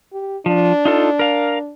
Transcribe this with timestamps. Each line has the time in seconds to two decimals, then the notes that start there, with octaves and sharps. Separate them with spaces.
0.13 G4
0.46 F3 D4
0.85 D#4 F4 A4
1.19 A#4 F5